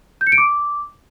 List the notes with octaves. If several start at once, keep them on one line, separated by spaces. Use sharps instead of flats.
G6
C#7
D7
D6